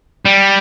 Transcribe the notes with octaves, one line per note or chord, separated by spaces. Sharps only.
G3